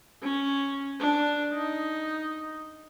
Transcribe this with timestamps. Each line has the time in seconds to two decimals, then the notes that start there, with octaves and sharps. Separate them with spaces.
0.22 C#4
1.00 D4
1.54 D#4